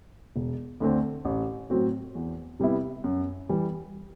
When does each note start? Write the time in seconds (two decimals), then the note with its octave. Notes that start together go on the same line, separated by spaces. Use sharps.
0.36 E1
0.80 D2 D3 A3 C4
1.25 A1
1.70 A2 F#3 C4 F#4
2.15 E2
2.60 C3 G3 B3 E4
3.04 F#2
3.49 E3 G3